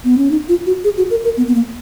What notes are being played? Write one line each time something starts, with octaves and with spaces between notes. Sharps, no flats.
B3
C#4
D#4
F4
F#4
G#4
F#4
A#4
A#4
B3
B3
A#3